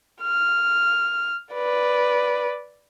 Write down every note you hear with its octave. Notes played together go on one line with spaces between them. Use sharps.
F6
B4 D5